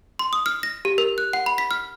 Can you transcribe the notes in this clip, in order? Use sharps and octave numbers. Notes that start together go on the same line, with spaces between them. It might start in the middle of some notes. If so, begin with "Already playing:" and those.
C6
D#6
F6
A#6
G4
A#4
F#6
F#5
B5
B6
F6